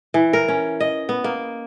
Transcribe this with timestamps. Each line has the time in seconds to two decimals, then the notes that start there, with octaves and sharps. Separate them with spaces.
0.14 E3
0.33 A#4
0.48 C#4
0.80 D#5
1.09 B3
1.24 A#3